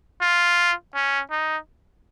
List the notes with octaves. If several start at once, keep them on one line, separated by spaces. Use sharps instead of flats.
F4
C#4
D#4